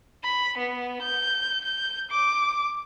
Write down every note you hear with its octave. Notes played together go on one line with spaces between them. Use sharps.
B5
B3
G6
G6
D6